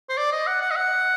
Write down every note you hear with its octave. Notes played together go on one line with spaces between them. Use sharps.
C5
D5
D#5
F#5
F#5
D#5
F#5